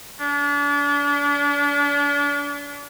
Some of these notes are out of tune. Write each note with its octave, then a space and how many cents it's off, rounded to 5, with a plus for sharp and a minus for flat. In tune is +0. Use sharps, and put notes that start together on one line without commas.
D4 -40